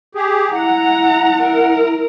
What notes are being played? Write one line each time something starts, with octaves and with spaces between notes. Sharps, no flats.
G4 G#4
E4 F#5 A#5
E4 A#4